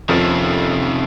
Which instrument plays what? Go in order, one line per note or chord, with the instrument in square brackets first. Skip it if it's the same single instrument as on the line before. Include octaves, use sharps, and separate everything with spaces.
[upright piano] F2 F3 [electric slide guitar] C3 D#3 A#3 C#4